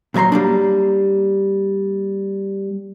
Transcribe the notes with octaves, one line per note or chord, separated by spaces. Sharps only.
A#2 F#3 C#5 A#5 C6
G3 A#3 D4